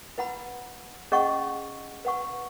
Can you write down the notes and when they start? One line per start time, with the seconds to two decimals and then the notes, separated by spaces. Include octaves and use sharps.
0.18 E4 B4 F#5 B5
1.12 C#4 G#4 D#5 F#5 C#6
2.05 B4 F#5 C#6